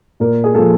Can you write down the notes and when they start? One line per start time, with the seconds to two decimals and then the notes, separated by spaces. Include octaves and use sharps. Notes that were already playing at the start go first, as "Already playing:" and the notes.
0.20 A#2 A#4
0.44 G#4
0.54 F3 A#3 A4